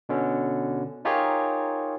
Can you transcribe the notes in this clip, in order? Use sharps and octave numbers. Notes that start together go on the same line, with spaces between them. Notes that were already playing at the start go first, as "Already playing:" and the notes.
B2 D3 C#4
D#4 F4 G4 G#4 A#4 C#5